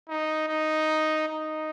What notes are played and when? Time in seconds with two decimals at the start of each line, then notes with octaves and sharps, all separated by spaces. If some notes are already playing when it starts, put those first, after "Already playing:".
0.09 D#4
0.48 D#4
1.28 D#4